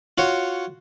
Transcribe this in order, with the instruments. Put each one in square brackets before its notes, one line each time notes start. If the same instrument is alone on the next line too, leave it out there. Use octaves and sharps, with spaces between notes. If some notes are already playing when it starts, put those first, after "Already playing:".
[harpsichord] F4 F#4 C#5